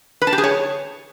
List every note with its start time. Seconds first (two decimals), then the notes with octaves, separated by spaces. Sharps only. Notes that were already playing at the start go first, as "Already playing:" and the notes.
0.22 B4
0.27 A5
0.33 G4
0.38 G#4
0.44 C#5